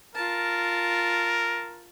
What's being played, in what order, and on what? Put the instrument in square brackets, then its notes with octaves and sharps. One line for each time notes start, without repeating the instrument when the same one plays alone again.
[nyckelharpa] F4 A5 [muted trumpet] A#4